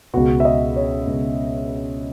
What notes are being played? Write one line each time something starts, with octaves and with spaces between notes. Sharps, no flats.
C#2 B2 F#4
E5
D#5
C#5
C#2 B2